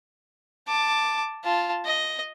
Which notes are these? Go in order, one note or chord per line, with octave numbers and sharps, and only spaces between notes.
A5 D6
F4 A5
D#5